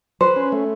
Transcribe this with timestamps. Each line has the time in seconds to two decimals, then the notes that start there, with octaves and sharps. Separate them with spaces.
0.21 B4 C5
0.36 C#4
0.52 A3